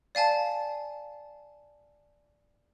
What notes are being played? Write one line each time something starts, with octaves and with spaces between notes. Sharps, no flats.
D5 F5 G#5 A5